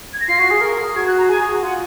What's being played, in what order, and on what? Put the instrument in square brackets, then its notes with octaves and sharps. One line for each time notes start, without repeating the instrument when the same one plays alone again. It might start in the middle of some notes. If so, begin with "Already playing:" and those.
[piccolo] G#6
A#6
[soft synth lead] F4 [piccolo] C7
[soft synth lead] F#4
G#4
A#4
G#4
[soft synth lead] F#4 [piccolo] G#6
[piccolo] F#6
A#5
[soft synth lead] G#4 [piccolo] G#5
[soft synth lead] G#4
F#4
[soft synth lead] F4 [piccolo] F#5